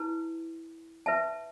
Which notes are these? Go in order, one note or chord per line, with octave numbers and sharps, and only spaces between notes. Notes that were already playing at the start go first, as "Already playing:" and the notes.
Already playing: E4 B4 A5
B4 E5 A5